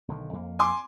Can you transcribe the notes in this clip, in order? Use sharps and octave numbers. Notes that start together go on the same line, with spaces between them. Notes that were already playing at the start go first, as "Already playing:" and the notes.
B1 D3 D#3
F2 A#3
G#5 C6 D6